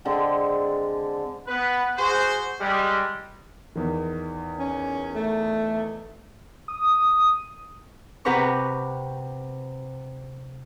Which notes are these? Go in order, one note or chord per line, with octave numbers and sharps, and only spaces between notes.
D3 G#3 C4
B3 B4
F#4 G#4 C5
G3 G#3
E2 D#3
C#4
A3
D#6
C3 G4 B4 F#5 A#5 C#6